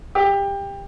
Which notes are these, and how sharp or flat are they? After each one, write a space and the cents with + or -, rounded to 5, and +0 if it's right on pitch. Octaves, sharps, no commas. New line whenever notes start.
G4 +20